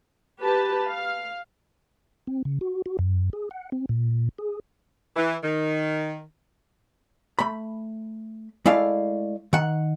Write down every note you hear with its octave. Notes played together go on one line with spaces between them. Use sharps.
G4 B4 A5
F5
C4
C#3
F#4
F#4
F#2
G#4
F#5
C4
A#2
G#4
E3
D#3
A3 B5
G#3 A3 E4 D5 F5
D#3 F#5